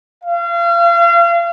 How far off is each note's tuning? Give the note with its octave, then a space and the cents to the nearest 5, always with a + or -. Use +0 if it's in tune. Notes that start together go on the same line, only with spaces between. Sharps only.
F5 -35